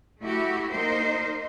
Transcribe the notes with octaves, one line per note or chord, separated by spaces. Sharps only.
A3 E4 F#4 G4
A#3 D#4 A#4 C5